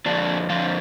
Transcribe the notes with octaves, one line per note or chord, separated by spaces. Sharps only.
F2 D3 F3 D4
F2 D3 F3 F4